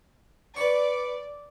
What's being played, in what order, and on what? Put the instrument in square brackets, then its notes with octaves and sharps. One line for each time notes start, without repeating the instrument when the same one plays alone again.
[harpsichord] B4 C#6 [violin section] D5